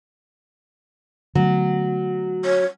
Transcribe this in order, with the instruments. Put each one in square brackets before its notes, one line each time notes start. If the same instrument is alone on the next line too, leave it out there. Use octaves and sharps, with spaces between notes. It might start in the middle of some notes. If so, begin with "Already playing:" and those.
[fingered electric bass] D3 A3 B3 [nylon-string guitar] F#3
[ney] C#5